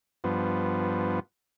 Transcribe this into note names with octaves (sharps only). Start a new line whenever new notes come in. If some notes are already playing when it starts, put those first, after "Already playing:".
G2 F3 B3